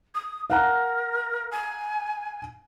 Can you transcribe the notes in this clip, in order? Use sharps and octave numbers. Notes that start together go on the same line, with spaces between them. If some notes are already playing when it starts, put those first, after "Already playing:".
D#6
A#4 F5 F#5 A#5
G#5